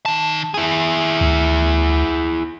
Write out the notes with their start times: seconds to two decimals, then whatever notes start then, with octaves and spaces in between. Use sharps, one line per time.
0.06 D#3 A5
0.54 E4 G#4
1.21 D2